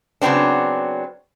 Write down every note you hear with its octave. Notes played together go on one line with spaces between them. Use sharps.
C#3 F#3 B3 C4 D4